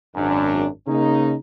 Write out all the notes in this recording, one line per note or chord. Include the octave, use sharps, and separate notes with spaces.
G#1 F#2 D4
C#3 A#3 C#4 D#4